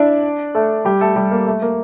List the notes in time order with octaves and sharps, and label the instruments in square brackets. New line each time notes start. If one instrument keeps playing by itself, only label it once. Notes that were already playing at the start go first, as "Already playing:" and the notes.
Already playing: [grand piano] D4 E4 D5 E5
A3 A4
G3 G4
A3 A4
G3 G4
A#3
A3
A#3